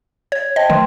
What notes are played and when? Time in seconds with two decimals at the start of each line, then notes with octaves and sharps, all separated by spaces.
0.32 C#5 G#6
0.56 C5 D#5 G5 A5
0.70 D#3 F#3 A3 B4 C6